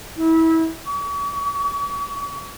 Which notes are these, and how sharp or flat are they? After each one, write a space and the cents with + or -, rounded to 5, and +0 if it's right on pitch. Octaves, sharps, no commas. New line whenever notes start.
E4 -25
C#6 +45